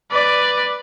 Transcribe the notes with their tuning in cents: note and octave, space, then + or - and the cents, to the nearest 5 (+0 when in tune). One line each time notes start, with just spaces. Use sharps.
B4 +0 D5 +5